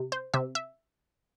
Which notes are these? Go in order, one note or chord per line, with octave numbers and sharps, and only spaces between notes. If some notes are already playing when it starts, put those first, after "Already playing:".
Already playing: C3
C5
C3 E5
E5